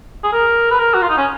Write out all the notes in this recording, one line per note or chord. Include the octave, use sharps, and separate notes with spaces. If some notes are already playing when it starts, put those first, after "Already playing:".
G#4
A#4
B4
A#4
F#4
F4
D#4
C#4